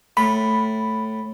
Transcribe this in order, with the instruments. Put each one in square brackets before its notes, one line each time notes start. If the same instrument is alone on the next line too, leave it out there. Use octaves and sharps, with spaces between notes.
[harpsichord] A2 [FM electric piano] B5